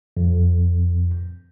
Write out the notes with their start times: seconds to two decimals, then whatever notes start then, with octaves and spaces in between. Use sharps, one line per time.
0.17 F2